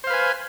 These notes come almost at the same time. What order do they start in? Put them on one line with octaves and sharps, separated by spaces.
C5 F5 B4 G#5